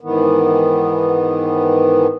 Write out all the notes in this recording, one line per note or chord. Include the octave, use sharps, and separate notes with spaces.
G#2 D#3 E3 B3